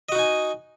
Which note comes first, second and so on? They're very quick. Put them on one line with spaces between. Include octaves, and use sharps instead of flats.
D#5 F#4 D#4 G#5